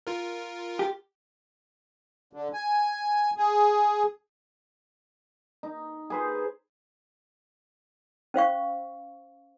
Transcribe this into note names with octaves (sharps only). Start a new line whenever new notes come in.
F4 A#4
G4
D3
G#5
G#4
D#4
G#4 B4 C5
C#4 C5 F5 C#6